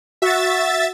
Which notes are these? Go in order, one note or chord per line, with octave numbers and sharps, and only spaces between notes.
F#4 E5 A6